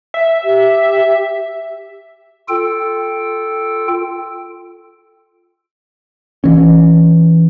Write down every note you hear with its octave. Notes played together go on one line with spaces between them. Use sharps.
E5
G4
F4 A4 G5
E3 C#4